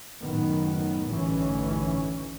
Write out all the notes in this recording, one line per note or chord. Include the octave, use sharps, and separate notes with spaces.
F#1 F#2 A2 D#3 B3
A1 D2 G2 D#3 E3 C#4